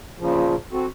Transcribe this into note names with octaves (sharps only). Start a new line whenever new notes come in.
A#2 C#3 F3
C4 F#4 A4